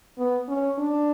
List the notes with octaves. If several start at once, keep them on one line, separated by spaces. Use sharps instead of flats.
B3
C#4
D4